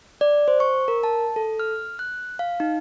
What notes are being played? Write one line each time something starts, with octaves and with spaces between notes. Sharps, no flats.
D5
C5
C#6
A#4
A5
A4
F6
F#6
F5
D#4